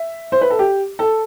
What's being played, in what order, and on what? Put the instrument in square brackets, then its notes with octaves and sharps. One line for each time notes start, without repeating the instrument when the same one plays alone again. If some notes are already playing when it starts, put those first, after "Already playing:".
Already playing: [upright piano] E5
C5
B4
A4
G4
A4